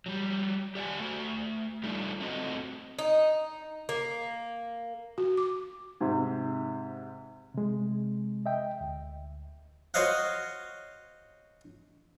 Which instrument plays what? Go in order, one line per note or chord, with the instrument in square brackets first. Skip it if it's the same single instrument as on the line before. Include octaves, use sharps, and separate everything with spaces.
[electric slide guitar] F#3 G3
G4 D5 E5 F#5 G#5
A3 F#4
G3 A3 D4 D#4 F4
A3 C4 F#4 D#5
[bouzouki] D#4
A#3
[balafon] F#4
D6
[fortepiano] G#2 C3
[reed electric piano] C3 G#3
D#5 E5 G5
D2
[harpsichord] F#4 C5 C#5 D#5 F5 F#5